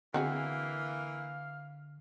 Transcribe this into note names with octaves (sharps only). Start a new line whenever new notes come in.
D3 E3 A#3 C4 F#4 G#4 F5